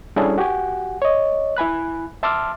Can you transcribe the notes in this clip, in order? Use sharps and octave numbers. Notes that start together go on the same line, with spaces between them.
G3 C#4 D4 E4 G#4 A4
F#4 G4 F#5 G#5
C#5 D#5
E4 G#5 B5 F#6
E5 A5 C6 D6 E6 F6